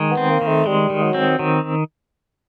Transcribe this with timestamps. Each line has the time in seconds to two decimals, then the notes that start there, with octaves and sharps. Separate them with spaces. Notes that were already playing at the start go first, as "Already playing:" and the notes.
Already playing: D#3 G#3
0.11 B3
0.17 C4
0.29 A#3
0.41 D#3
0.48 A3
0.66 G3 G#3
0.90 D#3
1.03 F#3
1.14 C4
1.39 D#3 F#3